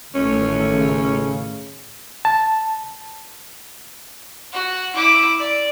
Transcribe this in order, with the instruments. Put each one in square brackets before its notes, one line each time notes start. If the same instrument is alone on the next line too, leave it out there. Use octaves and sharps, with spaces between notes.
[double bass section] A1 D#3 A3 [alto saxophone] C#4
[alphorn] C#3
[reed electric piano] A5
[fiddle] F#4
E4 D6
D5